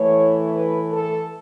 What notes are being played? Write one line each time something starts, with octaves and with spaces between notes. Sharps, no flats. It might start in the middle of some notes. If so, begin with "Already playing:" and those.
Already playing: A2 E3 A3 C#5
B4
A4